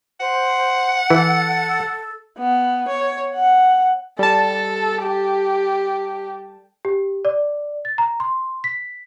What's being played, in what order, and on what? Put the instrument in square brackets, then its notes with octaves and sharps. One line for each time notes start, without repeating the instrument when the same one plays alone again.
[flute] C5 [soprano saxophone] F#5
[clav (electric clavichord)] E3 [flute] A4
[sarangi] B3
C#5
F#5
[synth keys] G3 A5 [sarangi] A4
[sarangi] G4
[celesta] G4
D5
A6
A#5
C6
B6